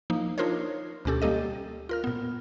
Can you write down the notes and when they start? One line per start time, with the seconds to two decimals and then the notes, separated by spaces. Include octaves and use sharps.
0.10 F3 A#3 D#4
0.38 D4 D#4 F4 A#4 C5 C#5
1.05 D2 B2 C#4 G4 A4
1.22 G3 A#3 G4 A4 D#5
1.89 F4 A#4 F6
2.04 A#2 B3